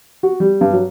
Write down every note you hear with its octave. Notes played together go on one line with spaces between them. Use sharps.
F#4
G3
G2
F#3